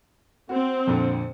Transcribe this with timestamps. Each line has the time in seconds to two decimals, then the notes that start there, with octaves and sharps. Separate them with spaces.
0.49 C4 F#4
0.87 F2 A#2 D3